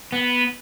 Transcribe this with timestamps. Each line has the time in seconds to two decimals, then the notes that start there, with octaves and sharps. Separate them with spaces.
0.12 B3